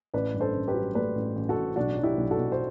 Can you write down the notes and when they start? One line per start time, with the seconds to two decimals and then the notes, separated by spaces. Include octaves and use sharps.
0.14 A1 B4 D5
0.34 G2
0.41 A4 C5
0.54 A1
0.68 G4 B4
0.74 F#3
0.95 A3 B4 D5
1.15 A1
1.36 A1
1.49 F#4 A4
1.56 A1
1.76 B1 D4 F#4
1.97 F#3
2.03 E4 G4
2.18 B1
2.31 F#4 A4
2.38 B1
2.52 C5